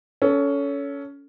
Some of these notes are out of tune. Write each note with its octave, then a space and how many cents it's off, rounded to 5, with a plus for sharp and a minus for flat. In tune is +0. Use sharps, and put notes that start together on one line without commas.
C#4 +20 A4 +0